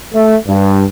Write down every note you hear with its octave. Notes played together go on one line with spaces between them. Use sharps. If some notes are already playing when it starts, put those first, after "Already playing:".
A3
G2